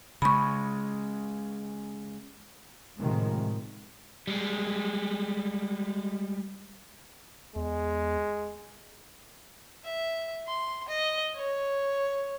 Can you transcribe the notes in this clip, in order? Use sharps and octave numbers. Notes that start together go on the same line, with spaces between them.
C#3 G#3 B5 C#6
A2 C3 D#3 F3 G#3
G3 G#3
E2 G#3
E5
C6
D#5
C#5